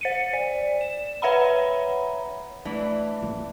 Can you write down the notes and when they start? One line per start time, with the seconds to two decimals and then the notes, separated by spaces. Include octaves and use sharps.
0.01 C5 C#7 D#7
0.33 D5
0.81 E7
1.22 B4 C#5 E5 F#5 A#5 B5
2.65 E3 A3 D4
3.22 A#3